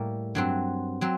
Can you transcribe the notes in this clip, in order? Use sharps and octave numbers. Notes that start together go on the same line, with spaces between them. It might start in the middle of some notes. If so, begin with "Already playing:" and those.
Already playing: A2 G3 A#3
G2 F#3 C4
F#3 C4